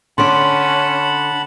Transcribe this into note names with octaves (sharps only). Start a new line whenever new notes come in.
D3 C#4 D5 F#5 A5 B5 C6